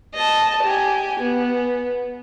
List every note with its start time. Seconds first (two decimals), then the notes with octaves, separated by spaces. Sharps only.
0.14 D#5 A5
0.64 G4 G#5
1.20 B3